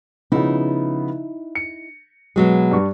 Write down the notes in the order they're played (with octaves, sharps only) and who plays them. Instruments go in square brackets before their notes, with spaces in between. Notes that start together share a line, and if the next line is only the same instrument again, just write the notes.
[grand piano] C#3 F3 B3 [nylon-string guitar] D#4 E4
[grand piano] C#7
[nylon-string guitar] B2 F#3 G#3
[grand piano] G2 D4 C#6